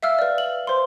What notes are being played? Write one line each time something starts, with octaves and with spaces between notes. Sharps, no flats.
E5 F5 E6 F6
B4 D5
F#7
C5 C6